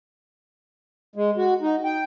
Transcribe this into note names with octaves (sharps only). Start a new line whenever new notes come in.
G#3
F#4
D#4
G5